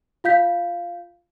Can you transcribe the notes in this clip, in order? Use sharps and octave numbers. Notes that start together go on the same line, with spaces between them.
F4 F5 G6 B6